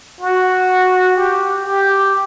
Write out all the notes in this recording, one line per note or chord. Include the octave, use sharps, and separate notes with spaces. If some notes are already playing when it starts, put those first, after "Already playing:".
F#4
G4
G4